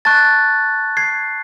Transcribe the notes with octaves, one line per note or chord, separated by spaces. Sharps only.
A5 C#6 F#6 A6
G#6 C7